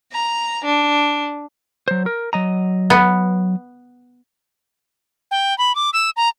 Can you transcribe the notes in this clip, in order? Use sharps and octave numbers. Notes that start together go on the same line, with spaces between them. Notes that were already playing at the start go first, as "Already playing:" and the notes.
A#5
D4
F#3 C5
A#4
F#3 D#5 A#5
B3
G5
B5
D6
E6
A#5